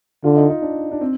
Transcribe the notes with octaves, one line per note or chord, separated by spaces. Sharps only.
D3 F4
D#4
D#4
D4
D4
C4